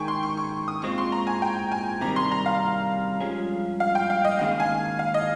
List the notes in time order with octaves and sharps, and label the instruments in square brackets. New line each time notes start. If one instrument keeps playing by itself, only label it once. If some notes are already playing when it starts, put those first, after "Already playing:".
Already playing: [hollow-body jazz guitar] D#3 G#3 D#4 G#4 [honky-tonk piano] G5 G#5 C#6
[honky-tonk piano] C6
C#6
C#6
D#6
[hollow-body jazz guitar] A#2 G#3 C4 F4 [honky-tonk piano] C#6
[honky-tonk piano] C6
A#5
G#5
G5
G#5
[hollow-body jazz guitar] C3 D#3 G3 [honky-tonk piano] A#5
[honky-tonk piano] C6
A#5
F5
[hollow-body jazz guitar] G2 F3 G#3 C#4 G#4
[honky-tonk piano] F5
G5
F5
D#5
[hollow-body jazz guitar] D#2 C#3 G#3 D#4 G#4 [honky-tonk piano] F5
[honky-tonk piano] G#5
F5
D#5